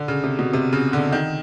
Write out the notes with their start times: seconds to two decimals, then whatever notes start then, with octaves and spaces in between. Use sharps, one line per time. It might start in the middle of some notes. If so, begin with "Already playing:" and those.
Already playing: D3
0.08 C#3
0.24 C3
0.39 B2
0.53 C3
0.73 C#3
0.93 D3
1.12 D#3